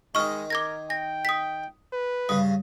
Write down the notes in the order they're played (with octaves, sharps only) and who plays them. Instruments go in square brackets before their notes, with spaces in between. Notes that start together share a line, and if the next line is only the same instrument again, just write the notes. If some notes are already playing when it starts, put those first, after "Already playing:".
[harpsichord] D#3 D#4 [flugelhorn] G#3 [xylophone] C#6 F6
[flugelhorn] A#4 [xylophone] D6 G#6 A#6
[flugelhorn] G5 [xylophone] A#6
[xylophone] D#6 B6
[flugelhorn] B4
[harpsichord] G2 C#3 [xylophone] D#6